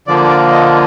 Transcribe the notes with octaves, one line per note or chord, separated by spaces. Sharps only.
D3 F3 A#3 D5
D5
D#5